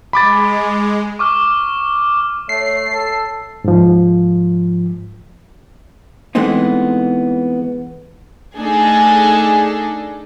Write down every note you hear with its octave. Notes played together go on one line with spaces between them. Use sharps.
G#3 B5 D6 A6
C#6 D6 F6
A3 C#5 C7
A4
G#2 F3
E3 G#3 A3 B3 C4 D#4
A3 D4 D#4 G#4 A4